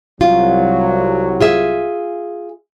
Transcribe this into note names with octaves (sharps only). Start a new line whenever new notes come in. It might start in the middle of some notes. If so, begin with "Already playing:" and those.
C2 F#3 F4
F4 G#4 E5